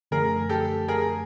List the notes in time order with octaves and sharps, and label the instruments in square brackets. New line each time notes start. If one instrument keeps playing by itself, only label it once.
[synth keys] F#2 D3 F3 A3 [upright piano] G#4 A#4
[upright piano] G4 A4
G#4 A#4